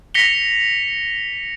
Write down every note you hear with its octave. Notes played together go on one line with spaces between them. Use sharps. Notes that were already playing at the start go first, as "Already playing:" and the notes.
A#6 B6 C#7 F7 G7